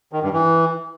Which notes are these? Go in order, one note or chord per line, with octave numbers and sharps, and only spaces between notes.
D#3
G2
E3